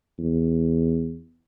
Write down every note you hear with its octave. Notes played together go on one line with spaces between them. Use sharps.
E2